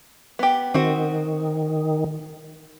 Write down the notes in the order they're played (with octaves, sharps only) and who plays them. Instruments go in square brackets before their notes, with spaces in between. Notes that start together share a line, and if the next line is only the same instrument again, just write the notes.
[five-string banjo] B3 G4
[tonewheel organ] D#3 [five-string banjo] C4 F#4